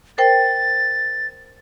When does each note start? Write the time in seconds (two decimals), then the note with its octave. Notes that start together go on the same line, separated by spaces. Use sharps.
0.18 A#4 C5 G5 A6